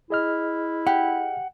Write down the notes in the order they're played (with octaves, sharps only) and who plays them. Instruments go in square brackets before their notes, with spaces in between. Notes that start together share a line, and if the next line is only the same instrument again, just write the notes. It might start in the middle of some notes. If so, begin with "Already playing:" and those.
[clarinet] E4 [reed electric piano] G#4 D#5 F6
[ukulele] G4 [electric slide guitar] F#5